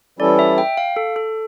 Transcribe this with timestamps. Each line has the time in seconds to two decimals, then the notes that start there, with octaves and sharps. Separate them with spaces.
0.19 E3 G3 C#4 E4 A4 D5
0.39 E5
0.58 G5
0.77 F5
0.96 A4
1.16 A4